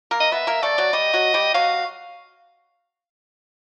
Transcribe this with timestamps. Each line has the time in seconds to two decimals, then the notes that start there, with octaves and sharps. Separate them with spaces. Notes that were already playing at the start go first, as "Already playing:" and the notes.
0.11 A#3 A#4
0.20 D#5
0.32 B3 B4 E5
0.47 A#3 A#4
0.63 A3 A4 D5
0.78 F#3 F#4
0.93 G3 G4 D#5
1.13 F#3 F#4
1.34 G3 G4
1.54 F#3 F#4 F5